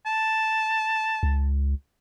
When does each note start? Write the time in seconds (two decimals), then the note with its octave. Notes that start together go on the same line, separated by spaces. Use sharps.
0.06 A5
1.23 C#2